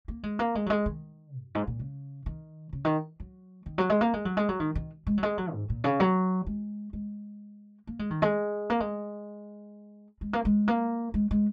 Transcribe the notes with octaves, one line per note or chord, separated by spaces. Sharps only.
A#3
G#3
A#3
G#3
F#3
G#3
D#3
F#2
G#2
A#2
C#3
D#3
C#3
D#3
F#3
D#3
F#3
G#3
A#3
G#3
F#3
G#3
F#3
D#3
D#3
G#3
F#3
G#3
F#3
G#2
A#2
C#3
F#3
G#3
G#3
A#3
G#3
D#3
G#3
A#3
G#3
G#3
A#3
G#3
A#3
G#3
G#3